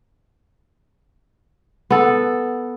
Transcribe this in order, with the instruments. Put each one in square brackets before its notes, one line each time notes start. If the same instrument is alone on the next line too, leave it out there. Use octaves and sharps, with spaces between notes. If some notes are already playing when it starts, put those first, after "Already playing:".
[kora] B3 A4